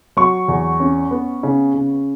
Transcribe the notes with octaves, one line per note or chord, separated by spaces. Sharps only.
F#3 C#6
E2
C#4
B3
C#3
C#3